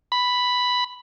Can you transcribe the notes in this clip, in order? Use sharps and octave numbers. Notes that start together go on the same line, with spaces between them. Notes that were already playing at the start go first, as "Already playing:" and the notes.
B5